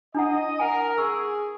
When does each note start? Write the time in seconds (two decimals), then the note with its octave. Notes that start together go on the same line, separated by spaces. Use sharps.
0.15 D4 E4 D#5 F#5 D#6
0.59 A#4 F#5 G#5
0.98 G#4 C#6 E6